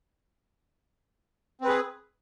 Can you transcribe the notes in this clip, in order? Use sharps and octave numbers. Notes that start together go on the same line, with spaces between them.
C4 G#4 B4